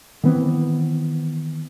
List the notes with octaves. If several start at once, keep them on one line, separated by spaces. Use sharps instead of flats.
D#3 E3 B3 C4